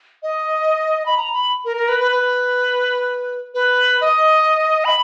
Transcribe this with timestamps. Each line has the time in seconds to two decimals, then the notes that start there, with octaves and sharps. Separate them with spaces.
0.23 D#5
1.06 B5
1.17 A#5
1.33 B5
1.65 A#4
1.77 A#4
1.89 B4
2.00 B4
2.12 B4
3.54 B4
4.01 D#5
4.85 B5